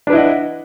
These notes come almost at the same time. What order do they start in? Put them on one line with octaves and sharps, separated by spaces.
D4 B4 E4 D#5 F#5